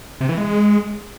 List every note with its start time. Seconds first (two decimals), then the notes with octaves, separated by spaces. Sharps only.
0.21 C3
0.29 E3
0.37 G#3